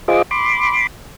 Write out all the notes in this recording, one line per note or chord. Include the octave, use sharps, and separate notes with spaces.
F4 G#4 C5 D#5 D6
B5 C6 D6